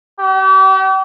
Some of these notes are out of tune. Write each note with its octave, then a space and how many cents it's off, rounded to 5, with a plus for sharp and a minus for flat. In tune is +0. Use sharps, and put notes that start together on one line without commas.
G4 -40